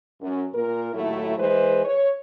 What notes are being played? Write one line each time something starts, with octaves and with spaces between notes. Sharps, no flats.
F#2
A#2 A#4
D#2 A2 F#3 A3 E4
E3 G#3 B4 C5
C#5